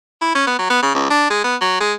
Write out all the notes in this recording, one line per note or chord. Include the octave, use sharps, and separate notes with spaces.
E4
C#4
B3
F#3
B3
C#3
C#2
D4
G#3
B3
F#3
G#3